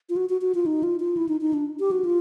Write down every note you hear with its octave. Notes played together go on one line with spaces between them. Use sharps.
F4
F#4
F#4
F#4
F4
D#4
F4
F4
E4
D#4
D#4
D4
G4
F#4
F4